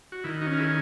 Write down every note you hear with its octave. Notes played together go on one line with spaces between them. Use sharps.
F#4
D#3 E4
D#4 F#4
C#4
A#4
E4 G#4